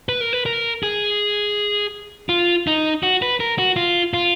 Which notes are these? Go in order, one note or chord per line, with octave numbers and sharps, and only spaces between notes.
B4
A#4
B4
A#4
G#4
F4
D#4
F#4
B4
A#4
F#4
F4
F4